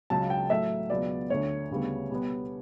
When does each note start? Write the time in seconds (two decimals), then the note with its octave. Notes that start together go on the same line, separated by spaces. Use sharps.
0.10 C#2 C#3 F#3 A5
0.30 G5
0.50 A2 F#3 A3 E5
0.90 C#2 B2 F#3 B3 D5
1.30 D2 D3 A3 C#5
1.71 D2 C#3 G3 B3
2.10 B2 G3 B3